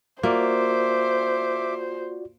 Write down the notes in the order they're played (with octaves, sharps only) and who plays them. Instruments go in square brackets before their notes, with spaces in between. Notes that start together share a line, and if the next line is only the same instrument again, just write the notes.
[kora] A#3 [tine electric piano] F4 F#4 D5 [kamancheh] C5 [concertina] E5 D6